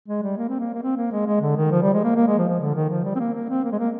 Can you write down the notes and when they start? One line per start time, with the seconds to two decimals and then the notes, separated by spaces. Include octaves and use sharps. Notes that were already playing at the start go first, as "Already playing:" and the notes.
0.08 G#3
0.23 G3
0.38 A#3
0.49 C4
0.60 A#3
0.74 A#3
0.82 C4
0.97 A#3
1.12 G#3
1.26 G#3
1.41 D3
1.56 D#3
1.71 F3
1.82 G3
1.94 G#3
2.04 A#3
2.16 A#3
2.27 G#3
2.38 F3
2.48 F3
2.60 D3
2.74 D#3
2.90 F3
3.04 G3
3.15 C4
3.19 A#3
3.34 A#3
3.49 C4
3.64 A#3
3.72 G#3
3.79 A#3